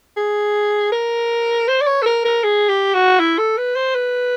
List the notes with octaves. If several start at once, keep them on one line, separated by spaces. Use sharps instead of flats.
G#4
A#4
C5
D5
C#5
A4
A#4
A#4
G#4
G4
F#4
E4
A4
B4
C5
B4